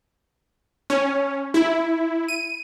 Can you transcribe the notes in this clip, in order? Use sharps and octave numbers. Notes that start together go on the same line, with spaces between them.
C#4
E4
D#7